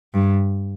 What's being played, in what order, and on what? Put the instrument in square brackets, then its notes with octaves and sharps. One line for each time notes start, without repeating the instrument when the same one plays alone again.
[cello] G2